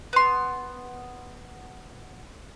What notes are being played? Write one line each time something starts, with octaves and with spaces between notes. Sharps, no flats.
B3 C6